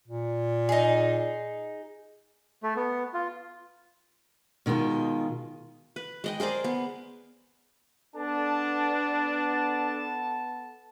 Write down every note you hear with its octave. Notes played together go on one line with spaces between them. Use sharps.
A#2
D#4 G#4
A3
B3
F4
B2 D#3 G#3 F4
B4
G#3 D#5 G5
G#4 A#4 C5 D5
B3
B3 D4 A4 A5